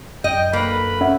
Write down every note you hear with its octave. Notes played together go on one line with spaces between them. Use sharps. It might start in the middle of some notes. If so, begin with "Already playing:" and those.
F#2 D#5 G5
D2 A#3 B4 B5
C#4 E5 F#5